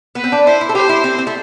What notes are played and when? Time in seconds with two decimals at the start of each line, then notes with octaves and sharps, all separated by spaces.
0.15 B3 B4
0.24 C4
0.32 D4
0.46 E4 C5
0.61 E4
0.69 A4
0.75 G4 C5
0.89 E4
1.04 C4
1.18 C4
1.27 A3